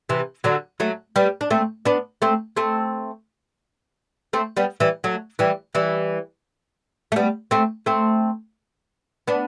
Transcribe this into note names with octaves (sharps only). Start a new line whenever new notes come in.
C3 E3
D3 F#3
F#3 A3
G3 B3
D4
A3 C4
B3 D4
A3 C4
A3 C4
A3 C4
G3 B3
E3 G3
F#3 A3
E3 G3
E3 G3
A3
G3 B3
A3 C4
A3 C4
B3 D4